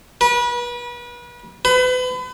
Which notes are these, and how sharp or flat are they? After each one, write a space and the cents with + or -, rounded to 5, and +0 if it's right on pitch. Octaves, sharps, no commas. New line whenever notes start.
B4 -35
B4 +35